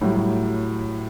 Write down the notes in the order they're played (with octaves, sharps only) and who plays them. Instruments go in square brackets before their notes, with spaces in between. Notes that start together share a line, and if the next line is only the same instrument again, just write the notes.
[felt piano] A2 F#3 G3